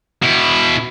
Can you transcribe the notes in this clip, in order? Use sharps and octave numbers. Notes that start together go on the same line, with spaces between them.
B2 E4